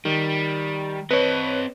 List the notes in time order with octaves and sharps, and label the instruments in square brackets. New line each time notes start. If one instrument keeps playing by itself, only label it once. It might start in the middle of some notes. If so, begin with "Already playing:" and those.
[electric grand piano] D#3 [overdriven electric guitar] G3
[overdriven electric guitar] C4 D#5 [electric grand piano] B4 C#5